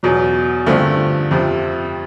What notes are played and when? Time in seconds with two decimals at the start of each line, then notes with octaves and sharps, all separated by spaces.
0.03 E2 B2 F#3
0.66 G2 D3 F3 A3 C4
1.31 F2 C3 F3